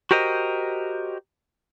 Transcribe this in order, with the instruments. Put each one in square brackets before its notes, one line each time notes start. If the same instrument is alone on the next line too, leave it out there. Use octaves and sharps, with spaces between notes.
[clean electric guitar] F#4 G4 A#4 C5 D#5